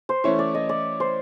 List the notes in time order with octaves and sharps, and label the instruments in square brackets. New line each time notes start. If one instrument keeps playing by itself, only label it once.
[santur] C5
[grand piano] E3 A3 C#4 E4 [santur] C#5
[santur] D5
D#5
D5
C5